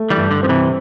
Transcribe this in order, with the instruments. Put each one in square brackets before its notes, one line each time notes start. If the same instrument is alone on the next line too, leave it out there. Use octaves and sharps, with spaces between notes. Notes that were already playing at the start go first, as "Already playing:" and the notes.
Already playing: [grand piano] A3
[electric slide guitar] E3 G3
[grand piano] G2
[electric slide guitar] D3
[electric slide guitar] F3 [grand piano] C4
[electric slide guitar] C3 E3